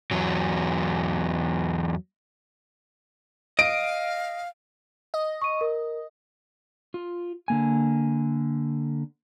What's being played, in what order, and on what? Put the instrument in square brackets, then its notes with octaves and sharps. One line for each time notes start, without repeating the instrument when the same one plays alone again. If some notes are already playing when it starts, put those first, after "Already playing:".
[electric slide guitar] E2 F#3
[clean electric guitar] D#5 [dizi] F5 [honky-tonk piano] D7
[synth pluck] D#5
[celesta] C#6 D#7
A#4
[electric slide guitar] F4
D3 A#3 G#5